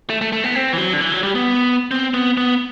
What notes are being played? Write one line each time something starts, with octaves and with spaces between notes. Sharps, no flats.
A3
A3
A3
B3
C4
E3
F#3
D3
E3
F#3
G3
B3
C4
B3
B3